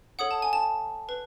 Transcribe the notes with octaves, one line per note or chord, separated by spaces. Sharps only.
A4 C#5 F#5 D#6
A5
G#5
A5
B4